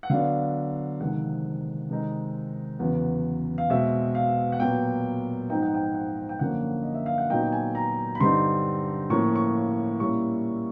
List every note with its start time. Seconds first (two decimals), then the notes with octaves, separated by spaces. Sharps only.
0.03 F#5
0.10 D3 F#3 B3 D4 F5
1.00 F2 C3 D#3 G#3 F#5
1.90 C3 D#3 G#3 C4 D#4
2.79 E2 C#3 F#3 B3
3.58 F5
3.70 B2 G#3 C4 E5
4.15 F5
4.52 F#5
4.60 A#2 F#3 B3 G5
5.50 G#2 F3 G#3 C4 D#4 G5
5.62 F#5
5.75 G5
5.94 F#5
6.29 G5
6.39 F#2 D3 F3 A#3 C#4 F#5
6.83 D#5
6.95 E5
7.06 F5
7.18 F#5
7.30 A#2 F#3 B3 D#4 G5
7.52 G#5
7.75 A#5
8.15 B5
8.20 G2 D3 G3 C4 D#4 C6
9.10 A2 F3 A#3 C#4 C#6
9.36 C#6
10.00 A#2 G3 A#3 C#4 E4 C#6